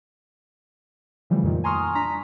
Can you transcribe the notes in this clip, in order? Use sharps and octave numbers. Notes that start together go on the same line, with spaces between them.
C#3 E3 F3 G3 A3
F2 A#2 D#3
G#5 A#5 C6 C#6 D#6 F6
D4 A#5 B6